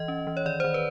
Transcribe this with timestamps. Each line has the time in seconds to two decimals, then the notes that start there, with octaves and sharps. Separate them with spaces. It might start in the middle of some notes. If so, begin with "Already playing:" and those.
Already playing: E3 D#5
0.08 C#4
0.27 E3
0.37 C#5
0.45 D#3 D5
0.60 D#3 C5
0.74 B4